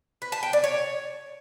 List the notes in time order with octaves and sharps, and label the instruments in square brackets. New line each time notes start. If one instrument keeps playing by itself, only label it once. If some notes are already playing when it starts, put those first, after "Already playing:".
[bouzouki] B4
A5
G5
D5
C#5